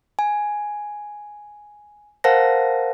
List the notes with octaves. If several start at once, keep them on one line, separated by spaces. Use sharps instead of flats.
G#5
A#4 C5 F5 F#5 A5 A#6